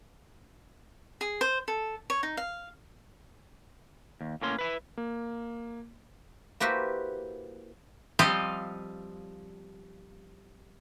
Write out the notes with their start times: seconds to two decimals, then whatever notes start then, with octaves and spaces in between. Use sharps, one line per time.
1.21 G#4
1.41 C5
1.68 A4
2.10 C#5
2.23 D#4
2.37 F5
4.21 D#2
4.42 A2 A#3 C#4 C6
4.59 E4 B4
4.97 A#3
6.60 A#3 E4 F#4 G4 B4 C5
8.19 F3 G3 C4 G4 D#5 F5